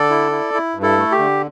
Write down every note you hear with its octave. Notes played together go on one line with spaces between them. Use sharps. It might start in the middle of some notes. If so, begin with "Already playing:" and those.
Already playing: D3 A4 D5
E4
E4
E4
G2
E4 A4
A3
G4
D3